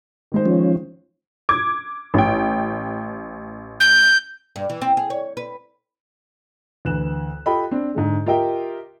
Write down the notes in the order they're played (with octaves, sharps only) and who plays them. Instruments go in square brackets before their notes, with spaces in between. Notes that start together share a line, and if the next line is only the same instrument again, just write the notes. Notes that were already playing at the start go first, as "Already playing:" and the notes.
[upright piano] D#3 G#3 C5
[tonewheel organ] F3 C#4
[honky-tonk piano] D6 G#6
A1 G5
[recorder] G6
[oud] G2
E3
C4
G#4
C#5
B4
[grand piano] D2 E3 F#6 E7
F4 G4 A4 D#5 G5 B5
C4 D4
G#2 D3 G#3
F4 G4 A#4 D#5 E5 G5